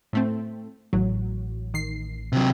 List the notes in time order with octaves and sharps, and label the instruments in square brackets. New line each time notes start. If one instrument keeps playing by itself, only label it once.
[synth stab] A2 A3 C4
[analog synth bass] A1 [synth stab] F#3
[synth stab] D#3 C7
[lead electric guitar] C3 F#3